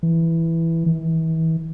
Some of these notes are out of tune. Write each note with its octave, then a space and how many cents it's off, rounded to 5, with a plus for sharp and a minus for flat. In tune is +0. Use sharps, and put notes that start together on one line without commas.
E3 +0
E3 -35